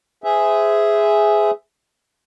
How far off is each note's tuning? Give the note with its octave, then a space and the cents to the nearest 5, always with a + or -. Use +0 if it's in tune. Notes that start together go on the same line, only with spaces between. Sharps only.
G#4 +0 C5 -35 E5 +0